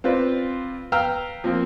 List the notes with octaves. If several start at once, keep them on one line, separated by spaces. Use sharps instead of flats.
C4 F4 B4 C5 D5
B4 F5 G5 A#5 E6 F6
F3 A#3 C4